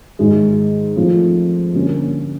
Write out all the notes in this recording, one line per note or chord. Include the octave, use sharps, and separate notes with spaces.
G#2 D#3 G#3
F3 A3 C4 F4
D3 G3 A#3 C#4